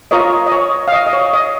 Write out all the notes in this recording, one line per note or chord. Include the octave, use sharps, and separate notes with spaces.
F4 A#4 C#5 D#5
D#5
C#5
F5
D#5
D#5
C#5
D#5